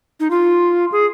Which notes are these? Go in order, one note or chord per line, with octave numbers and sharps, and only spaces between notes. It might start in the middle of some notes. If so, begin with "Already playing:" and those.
D#4
F4
G#4